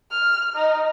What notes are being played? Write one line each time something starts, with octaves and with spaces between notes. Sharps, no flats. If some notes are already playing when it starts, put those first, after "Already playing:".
F6
D#4